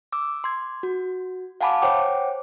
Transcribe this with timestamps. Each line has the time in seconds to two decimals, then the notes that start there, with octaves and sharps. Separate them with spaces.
0.12 D6 E6
0.44 C6 G#6
0.83 F#4
1.61 F5 F#5 G#5 A5 B5 D6
1.82 C5 C#5 F#5 G5 D6